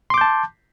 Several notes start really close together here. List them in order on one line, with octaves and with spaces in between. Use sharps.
C6 D6 G6 A5